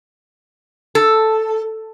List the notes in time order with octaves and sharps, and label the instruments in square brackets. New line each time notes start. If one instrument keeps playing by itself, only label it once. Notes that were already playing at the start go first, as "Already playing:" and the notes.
[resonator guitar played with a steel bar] A4